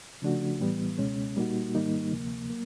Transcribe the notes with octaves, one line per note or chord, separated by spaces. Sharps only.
C#3 F3 A3 D4 F#4
A2 E3 G3 B3
C#2 B2 G#3 C#4
A#2 G3 A#3 D#4 F#4
G#2 D#3 G3 A#3 D#4
D2 C3 F3 A#3
F#3 A#3